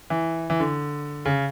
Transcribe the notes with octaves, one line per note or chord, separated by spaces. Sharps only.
E3
E3
D3
C#3